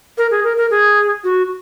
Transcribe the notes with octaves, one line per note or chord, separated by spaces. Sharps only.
A#4
G#4
A#4
A#4
G#4
F#4